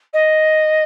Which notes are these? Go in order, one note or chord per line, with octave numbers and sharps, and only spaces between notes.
D#5